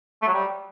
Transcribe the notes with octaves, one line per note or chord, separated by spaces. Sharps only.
A3
F#3
G3